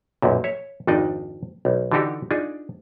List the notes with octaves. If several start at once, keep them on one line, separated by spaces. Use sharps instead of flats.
B1 F#2 A#2
C#5 E5
G#1 F2 D4 D#4 D5 D#5
B1
D3 E3 D4 D#4 F#4 G4
D4 D#4 F4 G#4